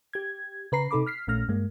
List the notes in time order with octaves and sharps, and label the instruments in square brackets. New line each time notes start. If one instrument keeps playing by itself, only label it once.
[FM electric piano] G4 G#6
C#3 B4 A#5 C7
C3 D#4 A4 B5 D6
F6 B6 C7
A#1 A#2 A3 C#4 F6 A#6
G2 G#3 A#3